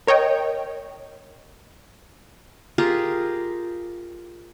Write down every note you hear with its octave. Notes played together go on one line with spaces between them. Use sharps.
A#4 C#5 D#5 G5
F4 G4 G#4 A#4